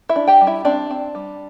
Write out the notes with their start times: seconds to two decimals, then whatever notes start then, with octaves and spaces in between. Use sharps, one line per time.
0.09 E4 E5
0.16 D4
0.27 G4 G5
0.41 G3
0.47 E4 E5
0.65 C4 D4 D5
0.91 C4
1.15 G3